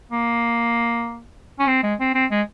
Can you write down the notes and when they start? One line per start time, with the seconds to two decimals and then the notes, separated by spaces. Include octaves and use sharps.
0.12 A#3
1.60 C#4
1.68 C4
1.84 G#3
2.00 C4
2.15 C4
2.31 G#3